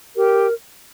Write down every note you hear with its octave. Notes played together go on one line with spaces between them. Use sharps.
G4 A#4